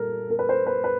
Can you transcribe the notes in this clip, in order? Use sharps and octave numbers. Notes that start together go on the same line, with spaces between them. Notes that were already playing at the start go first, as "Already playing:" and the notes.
Already playing: A#2 G3 A#3 A4 A#4
A#4
B4
C5
B4
B4